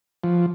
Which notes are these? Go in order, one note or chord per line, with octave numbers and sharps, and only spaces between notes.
F3